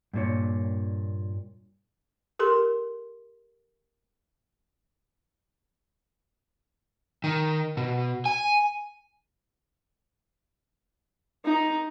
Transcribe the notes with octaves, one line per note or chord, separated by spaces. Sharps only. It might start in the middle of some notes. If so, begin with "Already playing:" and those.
G2 A#2 C#5
G4 A4 A#4 C6
D#3
B2
G#5
D#4